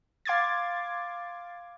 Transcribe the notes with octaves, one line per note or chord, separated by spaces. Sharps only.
F5 C6 D6 G#6 A6